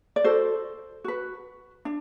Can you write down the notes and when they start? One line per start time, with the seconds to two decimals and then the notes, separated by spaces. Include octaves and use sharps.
0.16 D5
0.24 F#4 A4 C5
1.04 F#4 B4
1.85 D4